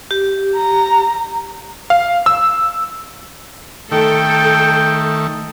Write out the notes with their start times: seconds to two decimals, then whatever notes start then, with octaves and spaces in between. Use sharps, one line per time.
0.11 G4
0.56 A#5
1.90 F5
2.26 E6
3.92 D#3 A3 A4 G5